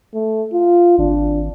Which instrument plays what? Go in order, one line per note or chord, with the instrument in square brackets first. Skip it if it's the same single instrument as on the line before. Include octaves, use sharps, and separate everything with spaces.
[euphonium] A3
F4
[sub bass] G#1 [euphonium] D4